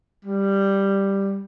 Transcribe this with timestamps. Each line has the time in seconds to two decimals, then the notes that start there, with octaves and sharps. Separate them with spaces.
0.25 G3